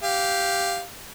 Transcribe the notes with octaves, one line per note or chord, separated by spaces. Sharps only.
G4 F5